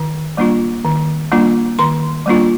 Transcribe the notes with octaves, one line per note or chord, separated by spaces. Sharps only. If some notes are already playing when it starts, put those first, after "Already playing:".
Already playing: D#3
G3 A#3 D4 F4
D#3
G3 A#3 D4 F4
D#3 C6
G3 A#3 D4 F4